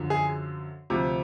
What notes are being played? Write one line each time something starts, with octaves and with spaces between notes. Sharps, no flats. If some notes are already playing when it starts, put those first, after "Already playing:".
Already playing: F#2 D3 F3
G#4
D2 C3 F3